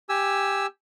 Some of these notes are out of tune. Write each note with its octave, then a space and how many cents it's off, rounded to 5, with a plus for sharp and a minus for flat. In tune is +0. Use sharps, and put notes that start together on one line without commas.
G4 +10 G#5 +0 E6 +0